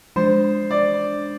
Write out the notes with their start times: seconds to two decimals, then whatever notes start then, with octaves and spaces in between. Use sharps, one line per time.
0.16 F3 G#3 D4 C5
0.71 D5